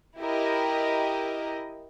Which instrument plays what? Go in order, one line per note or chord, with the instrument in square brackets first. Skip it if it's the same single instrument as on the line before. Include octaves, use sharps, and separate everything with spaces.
[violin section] E4 G4 A#4 D#5